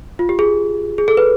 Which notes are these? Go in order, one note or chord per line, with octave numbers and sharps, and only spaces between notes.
F4
G4
G#4
G#4
A4
B4